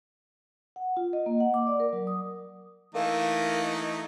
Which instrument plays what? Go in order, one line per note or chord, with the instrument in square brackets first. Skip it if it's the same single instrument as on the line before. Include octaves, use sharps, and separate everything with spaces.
[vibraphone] F#5
F4
D#5
A#3
F#5
D6
D5
A#4
F#3
D#6
[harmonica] E3 A3 D#4 [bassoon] A#3